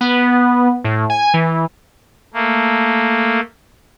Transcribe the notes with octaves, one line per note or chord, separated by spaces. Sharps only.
B3
A2
G#5
E3
A3 A#3